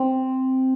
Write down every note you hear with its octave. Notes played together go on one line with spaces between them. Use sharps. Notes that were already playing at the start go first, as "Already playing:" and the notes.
Already playing: C4